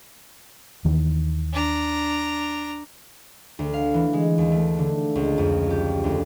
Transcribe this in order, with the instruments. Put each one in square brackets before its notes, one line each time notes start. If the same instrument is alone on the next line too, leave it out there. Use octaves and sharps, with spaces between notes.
[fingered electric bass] D#2 D#3 E3
[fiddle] D4 A#5
[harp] D2
F5
E3
G#3
D#2
A3
D3
C#2
F2
G4
D2